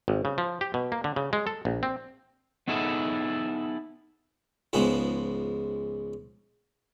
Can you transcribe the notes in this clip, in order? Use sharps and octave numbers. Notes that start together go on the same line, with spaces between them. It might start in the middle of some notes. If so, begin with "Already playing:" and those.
G#1
C#3
F3
G4
B2
A#3
D3
C#3
G#3
A4
A#1
C4
B3 D#4 E4 G#4 A4 E5
C#2 G#2 F3 G#3 B3